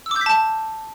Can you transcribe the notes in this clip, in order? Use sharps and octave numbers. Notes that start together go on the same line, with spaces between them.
E6
D6
G6
B6
A5